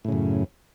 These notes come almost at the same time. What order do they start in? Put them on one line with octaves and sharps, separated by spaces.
A2 C#3 F#2